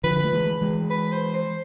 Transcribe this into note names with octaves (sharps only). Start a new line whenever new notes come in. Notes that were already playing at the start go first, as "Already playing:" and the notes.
D3 F3 B4
A3
E3 G#3
E3 G#3
B4
C5
C5